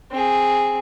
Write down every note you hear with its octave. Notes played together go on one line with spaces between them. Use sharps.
C4 G#4